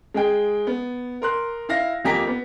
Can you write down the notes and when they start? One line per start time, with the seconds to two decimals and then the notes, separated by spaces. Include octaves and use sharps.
0.14 G#3 G#4 G5
0.67 B3
1.22 A#4 C6 F#6
1.69 E4 F5 A#6
2.05 F2 A#3 G4 G#5 A#5 B6
2.27 B3